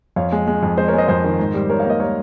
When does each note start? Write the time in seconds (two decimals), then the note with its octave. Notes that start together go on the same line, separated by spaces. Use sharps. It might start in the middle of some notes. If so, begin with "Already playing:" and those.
0.16 F2 C#5 F5
0.32 G#3
0.47 G#3
0.63 F2
0.78 G#3 C5 D#5
0.88 A#4 C#5
0.93 G#3 C5 D#5
1.08 F2 C5 D#5
1.24 D#3
1.39 G#2
1.54 G3
1.69 G3 A#4 C#5
1.80 A#3 C#5 F5
1.89 C5 D#5
2.00 G3 A#4 C#5